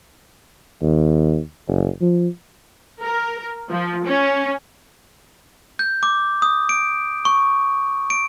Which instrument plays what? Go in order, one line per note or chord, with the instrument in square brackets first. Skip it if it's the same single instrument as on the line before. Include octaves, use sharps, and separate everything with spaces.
[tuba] D#2
F#1
F3
[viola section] A#4
F3
C#4
[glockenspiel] G6
D6
D#6
D7
C#6
D7